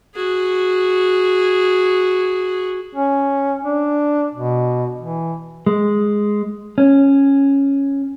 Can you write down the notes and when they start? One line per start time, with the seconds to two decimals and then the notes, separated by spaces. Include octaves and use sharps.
0.15 F#4 G#4
2.95 C#4
3.65 D4
4.35 B2
5.01 E3
5.67 G#3
6.78 C#4